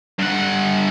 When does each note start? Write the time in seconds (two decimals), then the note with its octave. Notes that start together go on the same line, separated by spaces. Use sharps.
0.19 G2 F#5